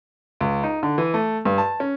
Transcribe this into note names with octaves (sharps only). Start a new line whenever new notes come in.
C#2
D#4
D3
E3
A3
G2
A5
C#4